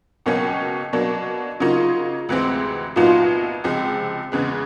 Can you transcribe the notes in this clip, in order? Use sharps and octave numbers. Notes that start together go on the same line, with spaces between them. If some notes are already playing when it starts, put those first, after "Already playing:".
C#2 B2 F#3 A#3 C#4
B2 F#3 A#3 D4
C#3 F#3 A#3 D#4 F4
D2 C3 E3 G#3 C4
C2 A#2 F#3 B3 D#4 F4
C#2 C3 F3 G#3
E2 C#3 E3 G#3